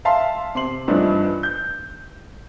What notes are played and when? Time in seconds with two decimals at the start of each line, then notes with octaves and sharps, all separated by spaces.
0.05 E5 F5 A5 C6
0.55 C3 C6 C7 F#7
0.88 G2 E3 F3 A3 D4 D#4
1.43 G6